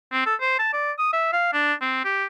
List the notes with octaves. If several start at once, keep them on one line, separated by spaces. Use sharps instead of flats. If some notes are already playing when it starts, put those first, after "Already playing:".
C4
A4
C5
A5
D5
D#6
E5
F5
D4
C4
G4